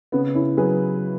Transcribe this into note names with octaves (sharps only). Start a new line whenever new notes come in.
C#3 B3
C#4 E4
F#3 G#4 B4